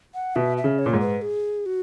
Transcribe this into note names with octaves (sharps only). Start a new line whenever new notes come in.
F#5
B2 E5
E5
C#3
C#5
A#2
G#2
B4
G#4
F#4